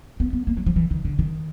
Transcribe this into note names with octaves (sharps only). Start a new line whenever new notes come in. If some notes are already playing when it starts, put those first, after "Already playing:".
B3
B3
A#3
F#3
F3
E3
D#3
D3
D#3